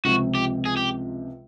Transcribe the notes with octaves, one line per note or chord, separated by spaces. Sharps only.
C#2 C3 F3 F#4
G4
G#4
G4